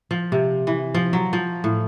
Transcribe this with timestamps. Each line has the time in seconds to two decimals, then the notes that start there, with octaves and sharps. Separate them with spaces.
0.11 F3
0.32 C3
0.67 E3
0.94 F3
1.13 F#3
1.33 F3
1.64 A2